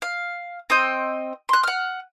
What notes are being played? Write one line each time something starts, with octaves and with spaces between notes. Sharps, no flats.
F5
C4 D#5 G5
C6 F#6
F#5 F6